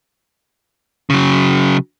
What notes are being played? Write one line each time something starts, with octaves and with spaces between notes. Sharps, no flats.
C#3 F#3